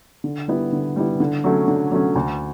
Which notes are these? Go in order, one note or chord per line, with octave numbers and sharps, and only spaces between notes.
D3
G3 B3 E4
D3
G3 B3 E4
D3
F#3 A3 C#4
D3
F#3 A3 C#4
D2